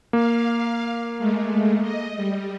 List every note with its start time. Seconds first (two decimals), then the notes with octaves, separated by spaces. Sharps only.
0.13 A#3 F5
1.18 G#3 A3
1.82 D#5
2.15 G3